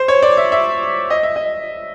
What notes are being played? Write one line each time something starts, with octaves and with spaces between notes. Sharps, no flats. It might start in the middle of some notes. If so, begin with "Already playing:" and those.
Already playing: C5
C#5
D5
E5
E5
D#5
E5
D#5